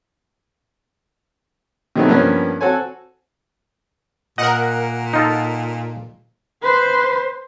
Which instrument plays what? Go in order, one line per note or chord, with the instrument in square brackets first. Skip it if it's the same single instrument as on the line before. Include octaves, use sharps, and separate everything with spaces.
[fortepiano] C3 D#3 F#3 A3 B3 C4
G2 F3 A#3 B3 C#4
C4 F#4 A4 C#5 G#5
[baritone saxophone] A#2 [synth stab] A#4 F#5 [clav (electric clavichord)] D#5
[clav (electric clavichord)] D#4 F4 A4
[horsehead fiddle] B4 C5